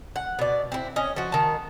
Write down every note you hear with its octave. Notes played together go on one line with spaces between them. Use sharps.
F#5
B2 D5
C4 E4
C#4 D#5
F3 F#4
D#3 A5